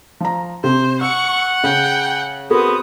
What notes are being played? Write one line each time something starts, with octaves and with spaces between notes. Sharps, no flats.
F3 A#5
C3 C5
F#5 C#6 E6
C#3 G5
B3 C4 F#4 G#4 A#4 D#6